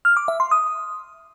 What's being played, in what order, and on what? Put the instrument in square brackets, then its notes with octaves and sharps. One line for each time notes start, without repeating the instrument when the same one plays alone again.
[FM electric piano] F6
D6
E5
C6
D#6